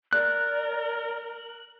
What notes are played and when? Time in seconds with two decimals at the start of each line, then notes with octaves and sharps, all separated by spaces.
0.13 A#4 D5 F#6